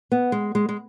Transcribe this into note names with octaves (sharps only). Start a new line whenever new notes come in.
B3
G#3
G#3
G#3